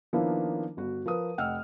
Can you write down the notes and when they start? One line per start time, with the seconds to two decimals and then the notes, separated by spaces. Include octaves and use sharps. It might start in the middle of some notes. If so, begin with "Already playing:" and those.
0.13 D#3 F3 A#3 B3 D4 E4
0.77 G1 F#4
1.06 F3 A#4 B4 D#6
1.38 F1 D#5 F#5 G5 E6 F6